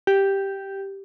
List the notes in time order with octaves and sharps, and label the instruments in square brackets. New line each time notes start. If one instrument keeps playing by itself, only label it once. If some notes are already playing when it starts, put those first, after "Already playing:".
[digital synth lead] G4